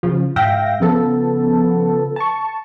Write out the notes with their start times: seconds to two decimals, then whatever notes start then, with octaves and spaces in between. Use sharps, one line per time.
0.03 C#3 F3
0.36 G#2 E5 F5 G5 A#6
0.80 C#3 F3 B3 A4
2.16 A5 C#6